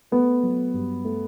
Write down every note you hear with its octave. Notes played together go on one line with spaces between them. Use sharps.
A3 B3
F#3
G2
A3